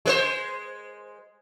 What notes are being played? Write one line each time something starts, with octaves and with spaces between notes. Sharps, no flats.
G#3 B4 C5